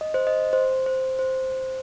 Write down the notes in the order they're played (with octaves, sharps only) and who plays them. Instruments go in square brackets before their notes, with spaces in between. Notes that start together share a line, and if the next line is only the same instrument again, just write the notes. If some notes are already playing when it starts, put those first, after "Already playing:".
[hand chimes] D#5
C5
D#5
C5
C5
C5